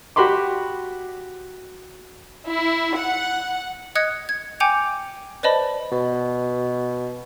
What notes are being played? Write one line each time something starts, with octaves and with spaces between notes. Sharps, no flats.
F#4 G4 B5 C6 D6
E4
F#5
D#5 D#6 F#6 G#6 C#7
G#6
G5 G#5 D6 G6 C#7 F7
B4 C5 D5 D#5 A5 B5
B2